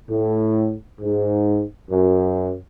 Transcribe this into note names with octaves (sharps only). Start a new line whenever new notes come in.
A2
G#2
F#2